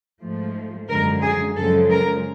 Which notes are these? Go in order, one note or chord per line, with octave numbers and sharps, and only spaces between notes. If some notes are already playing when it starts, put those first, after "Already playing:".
G#2 F3 A3
F#2 D3 F3 G#3 A#4
G#4
F#2 C#3 F3 G#3 A4
A#4